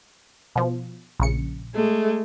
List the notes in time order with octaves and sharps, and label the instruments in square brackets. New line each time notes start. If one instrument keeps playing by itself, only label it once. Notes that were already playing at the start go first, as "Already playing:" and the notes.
[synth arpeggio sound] B2 F3
A#1 C#3 C#7
[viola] G#3 A3